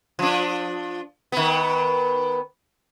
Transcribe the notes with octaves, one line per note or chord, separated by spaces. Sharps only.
F3 D4
D#3 B3